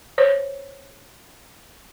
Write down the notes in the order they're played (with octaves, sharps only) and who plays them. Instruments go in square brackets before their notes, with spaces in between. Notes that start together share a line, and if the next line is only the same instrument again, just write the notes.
[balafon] C5 C#5